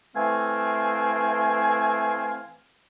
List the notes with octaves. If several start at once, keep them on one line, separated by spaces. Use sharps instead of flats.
E3 A3 C4 F5 G#5